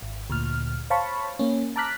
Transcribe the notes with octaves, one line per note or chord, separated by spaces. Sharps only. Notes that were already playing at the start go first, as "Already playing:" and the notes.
G#1
D2 A#2 F6
C5 C#5 F5 A5 B5 C#6
A#3 C#4
A5 A#5 D6 F6 F#6 B6